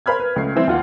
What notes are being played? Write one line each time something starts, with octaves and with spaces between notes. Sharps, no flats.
A#4 C5 B5 F6 G#6
B4
C#2 A3 C#4 C7
E3 G3 C4 E4
D#2 F4 F#5